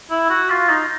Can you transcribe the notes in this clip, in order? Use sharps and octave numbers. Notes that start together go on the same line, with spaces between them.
E4
F#4
F4
D#4